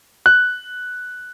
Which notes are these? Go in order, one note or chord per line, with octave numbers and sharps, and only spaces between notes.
F#6